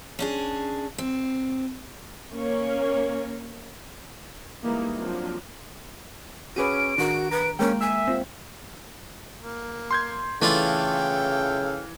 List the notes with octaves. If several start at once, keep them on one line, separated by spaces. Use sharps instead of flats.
C#4 D4 G#4
C4
A#3 C#4 C#5
E3 G3 G#3 A#3 D#4 E4
F3 F#3 A#3 C4 D4 F4
C#4 F#4 G#4 B4 D6 D7 D#7
A1 D#3 D4 F#4 A#4
B4 A#5
G#3 A#3 C#4 A#4 G5
E5 G#5
C4 F4
A#3
C6 G6 G#6
C#3 E3 A3 D4 F4 A4 F5 G5